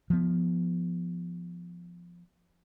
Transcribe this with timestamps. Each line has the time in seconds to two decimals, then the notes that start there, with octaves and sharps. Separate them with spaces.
0.10 F3 B3